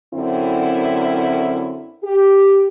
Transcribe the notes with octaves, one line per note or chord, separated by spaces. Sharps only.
F#2 D3 C4 E4
G4